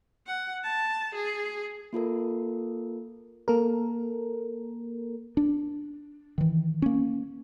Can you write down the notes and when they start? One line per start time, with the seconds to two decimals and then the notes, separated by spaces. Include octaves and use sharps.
0.26 F#5
0.64 A5
1.14 G#4
1.93 A#3 F4 A4 A#4
3.48 A#3 A4 A#4
5.37 D4
6.38 D#3 E3
6.82 A#3 C#4